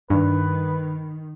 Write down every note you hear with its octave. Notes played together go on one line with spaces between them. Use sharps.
G2 D#3 B4